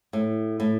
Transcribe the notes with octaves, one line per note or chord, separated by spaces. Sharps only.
A2
A2